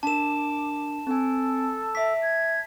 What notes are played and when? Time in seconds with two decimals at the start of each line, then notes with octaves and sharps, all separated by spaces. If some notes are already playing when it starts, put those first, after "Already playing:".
0.03 D4 A#4 A5 D6 E7
1.07 C4 A4 G#5
1.95 E5 D6 B6
2.22 G#6